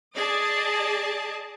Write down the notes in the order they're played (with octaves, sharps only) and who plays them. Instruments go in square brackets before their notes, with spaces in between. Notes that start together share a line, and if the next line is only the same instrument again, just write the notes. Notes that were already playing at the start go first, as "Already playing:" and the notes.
[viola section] G#4 D5 D#5 A5